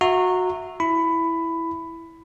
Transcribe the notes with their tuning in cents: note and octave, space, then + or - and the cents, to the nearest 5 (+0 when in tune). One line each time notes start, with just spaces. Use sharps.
F#4 -20 E5 +0 A#5 -20
E4 +0 B5 +15